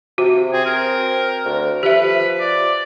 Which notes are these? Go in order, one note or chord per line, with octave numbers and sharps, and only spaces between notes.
C3 F#4
C4 G#4
A#4
D2
F3 G4 B4 E5
D5